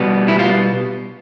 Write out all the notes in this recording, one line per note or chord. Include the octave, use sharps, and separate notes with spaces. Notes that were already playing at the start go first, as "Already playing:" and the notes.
Already playing: B2 G3 B3
E4
F4